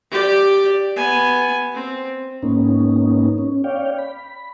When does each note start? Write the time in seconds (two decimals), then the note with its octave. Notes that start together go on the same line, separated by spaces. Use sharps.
0.11 G4 D5
0.96 B3 G#5
1.75 C4
2.43 G#2 A#3 B3 C#4 D#4
3.38 C#4
3.64 C#5 D5 F5 G5
3.98 B5